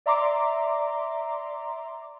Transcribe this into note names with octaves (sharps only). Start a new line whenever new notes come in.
D5 E5 A#5 C6 D6